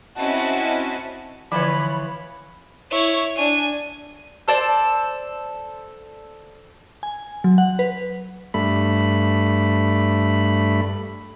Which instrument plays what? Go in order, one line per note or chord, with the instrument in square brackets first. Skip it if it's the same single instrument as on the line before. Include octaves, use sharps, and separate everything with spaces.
[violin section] C4 C#4 E4 F#4 D#5 A5
[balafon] D3 F3 [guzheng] E3 F4 C#5 [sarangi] B5
[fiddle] E4 C#5
D4 G#5
[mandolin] A4 C5 D5
[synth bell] G#5
F#3
F#5
B4
[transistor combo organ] G2 A3 B5